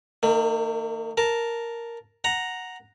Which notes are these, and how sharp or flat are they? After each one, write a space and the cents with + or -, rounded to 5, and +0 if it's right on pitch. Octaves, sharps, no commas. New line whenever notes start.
D#3 +0 A#3 -45
A#4 +0 A5 +0
F#5 -5 A#5 +0